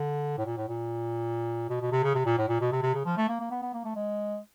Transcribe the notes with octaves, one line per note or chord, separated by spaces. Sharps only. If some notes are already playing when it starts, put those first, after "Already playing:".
Already playing: D3
A2
A#2
A2
A#2
B2
B2
C3
C#3
C3
A#2
A2
A#2
B2
C3
C3
C#3
F3
A3
A#3
A#3
B3
B3
A#3
A3
G#3